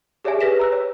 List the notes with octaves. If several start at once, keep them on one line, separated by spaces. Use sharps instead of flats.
G4 G#4 C#5 D5 E5 G#5
G4 B4 A#6 B6 E7
A#5 E6 F#6
C#5